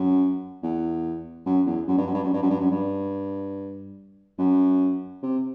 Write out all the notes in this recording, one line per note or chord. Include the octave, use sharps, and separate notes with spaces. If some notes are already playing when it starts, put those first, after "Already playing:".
Already playing: F#2
E2
F#2
E2
F#2
G2
F#2
G2
F#2
G2
F#2
G2
F#2
G2
F#2
C3